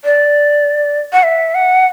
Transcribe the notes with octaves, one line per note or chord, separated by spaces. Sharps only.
D5
F#5
E5
F#5